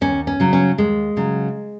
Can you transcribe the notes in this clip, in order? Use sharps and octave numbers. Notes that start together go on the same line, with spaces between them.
D#2 C#4
C#4
C#3 F#3
C#4
D#2 G#3
C#3 F#3